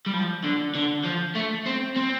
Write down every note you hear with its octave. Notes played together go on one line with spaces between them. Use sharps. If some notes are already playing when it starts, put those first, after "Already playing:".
G3
F3
D3
D3
F3
A3
C4
C4